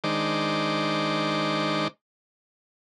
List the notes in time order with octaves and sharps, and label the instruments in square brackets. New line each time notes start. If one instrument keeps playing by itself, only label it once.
[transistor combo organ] D#3 G#3 D4 D#4 C5 D6